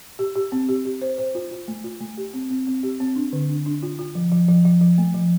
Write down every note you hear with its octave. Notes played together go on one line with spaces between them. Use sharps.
G4
G4
C4
G4
G4
C5
C5
F4
F4
A3
F4
A3
G4
C4
C4
C4
G4
C4
D4
D3
D4
D4
F4
F4
F3
F3
F3
F3
F3
A3
F3